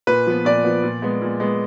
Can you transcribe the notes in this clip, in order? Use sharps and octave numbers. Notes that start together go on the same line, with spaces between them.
A#2 B4
F3 B3
A#2 D5
F3 B3
A#2
G#3 B3
A#2
G#3 B3